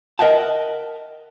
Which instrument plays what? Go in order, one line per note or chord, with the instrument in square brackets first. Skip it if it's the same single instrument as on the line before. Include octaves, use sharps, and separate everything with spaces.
[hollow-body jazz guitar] A#4 D#5 E5 F#5 G5 A5